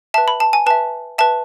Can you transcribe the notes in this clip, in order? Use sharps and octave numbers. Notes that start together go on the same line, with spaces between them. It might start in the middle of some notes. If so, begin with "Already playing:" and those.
B4 E5 A5
B5
A5
G#5
B4 E5 A5
B4 E5 A5